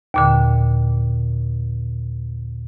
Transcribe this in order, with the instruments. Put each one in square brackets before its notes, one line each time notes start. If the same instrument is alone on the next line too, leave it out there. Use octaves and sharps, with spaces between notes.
[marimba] D#2 A#2 D3